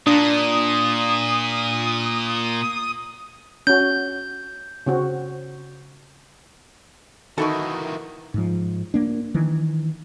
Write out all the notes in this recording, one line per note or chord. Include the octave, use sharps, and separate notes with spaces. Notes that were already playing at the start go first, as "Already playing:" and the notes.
A#2 D4 D#6
C#4 F#4 G6
C#3 C4 F#4
D#3 E3 A#3 D#4 E4 F#4 A4 C#6
G#2 F3
A#3 D4
D#3 E3